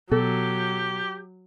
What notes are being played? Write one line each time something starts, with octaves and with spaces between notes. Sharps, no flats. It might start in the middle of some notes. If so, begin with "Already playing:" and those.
B2 F#3 G4 A4